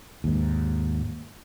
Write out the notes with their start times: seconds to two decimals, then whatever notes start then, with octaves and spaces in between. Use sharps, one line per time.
0.24 D#2 G#2